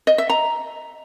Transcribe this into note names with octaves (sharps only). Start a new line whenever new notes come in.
D#5
E5
A#5